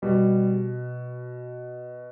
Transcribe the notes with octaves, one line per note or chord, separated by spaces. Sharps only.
B2 G3